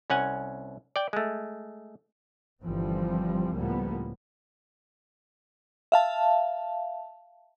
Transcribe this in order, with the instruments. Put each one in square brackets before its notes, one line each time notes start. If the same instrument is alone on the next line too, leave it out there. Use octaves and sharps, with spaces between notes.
[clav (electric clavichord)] C2 C#4 F#5 G#5
D5 G5
G#3 A3
[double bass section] G1 E3 F3 G3 C4
C#2 A2 F3 G3 A#3 B3
[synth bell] E5 F5 A5